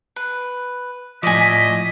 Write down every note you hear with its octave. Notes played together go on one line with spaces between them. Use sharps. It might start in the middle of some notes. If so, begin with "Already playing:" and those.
B4
A2 F3 D5 D#5 G#5 B6